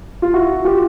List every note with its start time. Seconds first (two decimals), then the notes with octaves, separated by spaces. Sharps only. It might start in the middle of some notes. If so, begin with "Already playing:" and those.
0.22 F4
0.33 E4 F#4
0.65 F4 G4